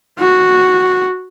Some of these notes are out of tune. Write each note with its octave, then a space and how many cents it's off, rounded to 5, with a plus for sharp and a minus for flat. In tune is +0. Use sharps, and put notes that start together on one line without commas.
F#4 -5